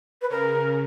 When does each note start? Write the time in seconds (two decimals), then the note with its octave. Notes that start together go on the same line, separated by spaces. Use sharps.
0.22 B4
0.30 C#3 A#4